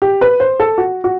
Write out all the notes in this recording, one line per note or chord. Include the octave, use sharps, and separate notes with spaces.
G4
B4
C5
A4
F#4
F#4